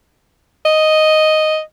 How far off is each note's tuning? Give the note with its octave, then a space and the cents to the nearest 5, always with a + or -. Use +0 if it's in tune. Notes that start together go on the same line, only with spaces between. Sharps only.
D#5 +0